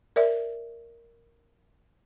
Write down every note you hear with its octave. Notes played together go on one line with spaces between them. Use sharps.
A#4 D5 E5